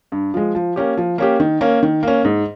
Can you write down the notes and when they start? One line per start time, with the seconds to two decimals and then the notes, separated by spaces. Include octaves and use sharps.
0.12 G2
0.34 F3 G#3
0.55 F3
0.76 A#3 C#4 G4
0.97 F3
1.18 A#3 C#4 G4
1.40 D#3
1.61 A#3 C#4
1.83 D#3
2.03 A#3 C#4
2.25 G#2